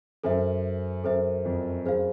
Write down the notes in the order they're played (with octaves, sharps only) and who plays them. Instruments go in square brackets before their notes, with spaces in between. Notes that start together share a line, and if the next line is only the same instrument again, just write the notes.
[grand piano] F#2 [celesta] A4 C5 E5
[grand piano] F#2 [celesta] A4 C5 E5
[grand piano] F2
[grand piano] F#2 [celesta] G#4 C5 F5